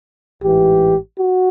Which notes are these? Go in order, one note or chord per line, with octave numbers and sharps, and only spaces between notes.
A1 G#2 E3 G4
F#4